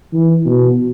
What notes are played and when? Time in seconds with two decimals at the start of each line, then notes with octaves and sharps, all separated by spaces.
0.13 E3
0.46 B2